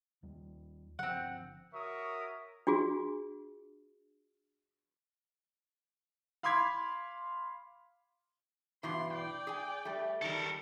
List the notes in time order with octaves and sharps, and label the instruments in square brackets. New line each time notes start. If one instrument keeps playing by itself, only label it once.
[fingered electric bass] D#2 G3
[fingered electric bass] G1 D3 F3 [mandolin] C4 F#5
[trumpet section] F#4 A#4 C#5 E5 C#6 D#6
[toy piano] D4 F4 F#4 G#4
[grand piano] F5 B5 C6 D6 G#6 B6
[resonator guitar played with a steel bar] G2 B2 E3 [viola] C6
[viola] D5 G5
[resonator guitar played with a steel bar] G#4 G#5
G3 A3
[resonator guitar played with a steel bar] D#3 G3 [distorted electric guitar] A4 A#4